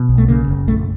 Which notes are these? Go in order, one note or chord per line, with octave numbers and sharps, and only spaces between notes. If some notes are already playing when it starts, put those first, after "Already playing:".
Already playing: B2
B1
A3
C#3 A#3
F#1
A#1 A3